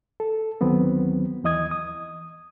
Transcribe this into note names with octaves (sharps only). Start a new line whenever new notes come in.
A4
D2 D#3 F#3 B3 C4
D#2 E3 D#5 D#6 G#6
D#6